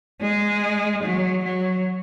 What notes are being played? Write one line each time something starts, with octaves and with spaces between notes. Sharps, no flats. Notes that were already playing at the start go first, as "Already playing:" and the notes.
G#3
F#3
F#3